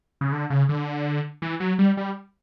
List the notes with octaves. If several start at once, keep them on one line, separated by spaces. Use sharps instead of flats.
C#3
D3
C#3
D3
E3
F#3
G3
G3